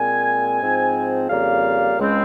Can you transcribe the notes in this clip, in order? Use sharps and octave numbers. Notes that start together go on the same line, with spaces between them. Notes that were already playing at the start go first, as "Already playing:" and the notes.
Already playing: A#2 G#3 C4 G#5
G#2 F3 C4
F2 C#3 G3 A#3 F5
C#2 C#3 G#3 C4